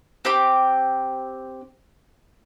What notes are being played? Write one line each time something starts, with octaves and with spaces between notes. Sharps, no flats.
C4 G4 G5 D6